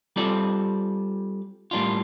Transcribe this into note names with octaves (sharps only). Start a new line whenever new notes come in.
G3 C4 F4 A4 D5
A2 G3 A#3 D4 F4